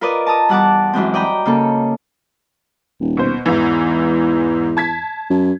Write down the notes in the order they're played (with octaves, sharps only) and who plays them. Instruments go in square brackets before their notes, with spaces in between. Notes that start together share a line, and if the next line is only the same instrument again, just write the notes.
[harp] F4 A#4 B4 D5 D#5
A5 A#5 D#6
E2 G3 F#5 A5 D6
F#2 E3 G#3 C4
D5 D#5 G5 A#5 B5
C#3 A#3 A4
[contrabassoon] D#1
[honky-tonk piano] B2 C5
[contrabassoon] E2 [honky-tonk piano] G#2 E3
[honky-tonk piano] A5 G#6 B6
[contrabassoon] F#2